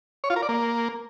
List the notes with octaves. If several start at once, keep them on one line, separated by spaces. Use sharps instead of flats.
C#5
F4
A#4
D5
A#3